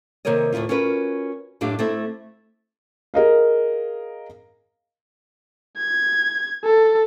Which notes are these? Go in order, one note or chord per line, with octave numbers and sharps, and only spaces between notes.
C3 D#3 A#3 A#4 C#5 D#5
D2 A2 F3 E4 F4
C#4 F4 F#4 A#4 B4
F#2 A2 D4 G4 D#5 F5
A3 C4 E4
G#4 A#4 D#5 F5
G#6
A4